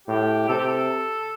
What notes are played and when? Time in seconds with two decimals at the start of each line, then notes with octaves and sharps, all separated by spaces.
0.08 A2 G4
0.49 C3 A4
0.58 G4
0.67 A4